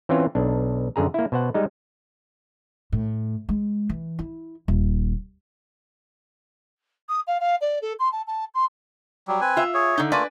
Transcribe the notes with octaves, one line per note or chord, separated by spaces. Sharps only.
E3 C4 C#4 F4
B1 D4
F#2 D3 G#4 A#5
A#3 E4
B2 C5 F#5
G3 G#3 D#4
A2
G#3
E3
E4
D#1
D#6
F5
F5
D5
A4
C6
A5
A5
C6
F#3 G3
C4 B4 G#5
F4 E5
G#4 C#5
D3 D#4
A3 A#3 F4 B4 D5 G#5